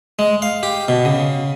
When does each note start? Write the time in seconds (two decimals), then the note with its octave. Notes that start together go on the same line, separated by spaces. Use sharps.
0.19 G#3
0.42 F5
0.63 G4
0.88 B2
1.05 C#3